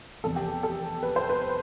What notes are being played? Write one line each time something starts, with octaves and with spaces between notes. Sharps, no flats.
F1 E2 C3 A4
G4
A4
B4
C5
B4